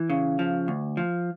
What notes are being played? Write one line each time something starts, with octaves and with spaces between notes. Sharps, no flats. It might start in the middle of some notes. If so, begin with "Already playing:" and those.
Already playing: E3
C#3
F3
D2
F3